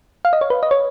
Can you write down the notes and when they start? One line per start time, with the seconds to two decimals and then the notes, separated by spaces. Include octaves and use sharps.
0.25 F5
0.33 D#5
0.41 C#5
0.50 B4
0.63 D#5
0.71 C#5